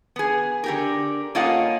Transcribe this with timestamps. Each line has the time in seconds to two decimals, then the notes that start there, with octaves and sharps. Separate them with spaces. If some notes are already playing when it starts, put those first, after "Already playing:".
0.16 B3 G#4
0.64 D3 G4 A#4
1.35 A#3 C#4 F4 A4 D#5 F#5